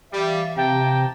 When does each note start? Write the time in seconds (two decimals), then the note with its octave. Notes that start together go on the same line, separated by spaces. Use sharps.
0.12 E3 G3 E5 F5
0.56 C3 G4 G5 A5 A#5